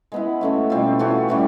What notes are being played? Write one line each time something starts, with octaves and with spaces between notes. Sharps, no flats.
G#3 B3 E4
F#3 A3 C#4
B2 G3 C4 F4
E3 A3 C#4 F#4
A2 E3 G3